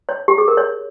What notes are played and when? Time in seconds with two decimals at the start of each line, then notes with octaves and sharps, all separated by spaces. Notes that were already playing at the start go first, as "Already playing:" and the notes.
0.09 C#5
0.28 G4
0.38 G#4
0.48 A#4
0.57 C#5